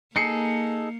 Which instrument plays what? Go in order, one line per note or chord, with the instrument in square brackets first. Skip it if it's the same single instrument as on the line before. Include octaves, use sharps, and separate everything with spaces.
[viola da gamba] A#3 [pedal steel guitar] D#4 G#4 A4 [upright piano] C7 C#7